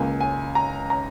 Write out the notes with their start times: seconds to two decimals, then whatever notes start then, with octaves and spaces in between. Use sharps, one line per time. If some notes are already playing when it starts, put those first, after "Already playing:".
Already playing: C#2 C#3 A#3 G#5
0.20 G#5
0.55 A#5
0.90 A#5